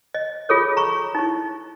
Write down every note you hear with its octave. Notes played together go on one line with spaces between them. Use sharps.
D#5
F4 G#4 A4 C#5
A#5 C#6
D#4 E4